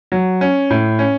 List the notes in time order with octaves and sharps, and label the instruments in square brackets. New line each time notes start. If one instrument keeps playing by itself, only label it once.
[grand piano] F#3
C#4
A2
C#4